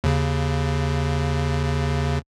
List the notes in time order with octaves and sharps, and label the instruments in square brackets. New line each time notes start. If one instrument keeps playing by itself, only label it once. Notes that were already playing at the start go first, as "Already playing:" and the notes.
[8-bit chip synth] D#2 C#3